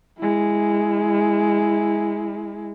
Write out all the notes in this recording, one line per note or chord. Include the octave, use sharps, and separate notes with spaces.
G#3 E4